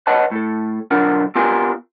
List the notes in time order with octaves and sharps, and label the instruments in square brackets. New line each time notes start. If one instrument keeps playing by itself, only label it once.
[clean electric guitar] B4 C#5 D#5 F#5 A5
A2 A4
B1 D3 D4 F4 A#4 F#5
B3 F4 G4 A#4 F5 G#5